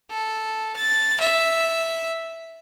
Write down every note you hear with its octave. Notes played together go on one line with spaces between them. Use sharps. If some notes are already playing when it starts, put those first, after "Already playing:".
A4
A6
E5